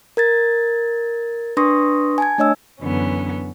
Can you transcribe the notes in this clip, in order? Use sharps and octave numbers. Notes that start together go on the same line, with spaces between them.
A#4 G#6 A6
D4 B4 C6 C#6 D#6 A#6
G#5 A5 G#6
A3 D4 C#5 D#5 E6
F#2 D3 E3 B3 C#4